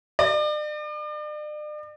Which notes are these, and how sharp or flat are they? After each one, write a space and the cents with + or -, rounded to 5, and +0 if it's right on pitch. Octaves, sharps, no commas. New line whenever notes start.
D5 +40